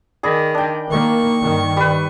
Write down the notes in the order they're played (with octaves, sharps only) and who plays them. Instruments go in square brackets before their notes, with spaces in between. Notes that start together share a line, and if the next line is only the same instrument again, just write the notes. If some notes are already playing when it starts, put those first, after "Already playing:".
[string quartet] D#3 [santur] G#4 D5 B5
[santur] D4 G5
[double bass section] D#3 A#3 [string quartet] C#6
[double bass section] G2 D#3
[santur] G3 B4